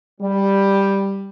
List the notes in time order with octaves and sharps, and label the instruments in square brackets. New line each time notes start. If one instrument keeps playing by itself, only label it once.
[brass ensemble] G3